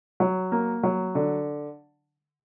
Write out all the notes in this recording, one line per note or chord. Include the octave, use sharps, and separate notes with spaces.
F#3
A#3
F#3
D3